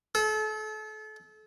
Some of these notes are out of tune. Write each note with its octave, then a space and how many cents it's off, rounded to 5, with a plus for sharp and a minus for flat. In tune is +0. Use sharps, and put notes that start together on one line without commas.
A4 -35